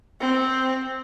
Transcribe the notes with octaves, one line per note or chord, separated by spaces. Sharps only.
C4